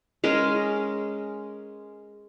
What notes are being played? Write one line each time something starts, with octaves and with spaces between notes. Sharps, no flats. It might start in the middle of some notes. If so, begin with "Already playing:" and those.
G#3 C#4 A#4 D#5